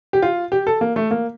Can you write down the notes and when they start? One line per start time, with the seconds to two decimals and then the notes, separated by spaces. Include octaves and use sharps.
0.13 G4
0.22 F4
0.52 G4
0.67 A4
0.81 A#3
0.96 A3
1.11 A#3